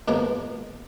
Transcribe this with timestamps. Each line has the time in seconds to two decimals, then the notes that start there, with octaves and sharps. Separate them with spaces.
0.08 D#2 G#2 B2 F3 A#3